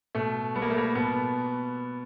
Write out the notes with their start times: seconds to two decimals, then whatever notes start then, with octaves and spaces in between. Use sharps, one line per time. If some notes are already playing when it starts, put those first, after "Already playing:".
0.15 B2 A3
0.55 G3 B3
0.62 A#3
0.70 A3
0.78 A#3
0.95 B2 B3